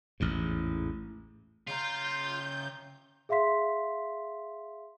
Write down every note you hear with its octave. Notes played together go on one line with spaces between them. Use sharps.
A1 E2 G#2
C#3 F4 A#5 G6
G#4 E5 F5 C6 B6